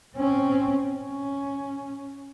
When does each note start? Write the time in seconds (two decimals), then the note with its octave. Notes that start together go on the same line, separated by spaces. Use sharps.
0.17 C4 C#4
0.95 C#4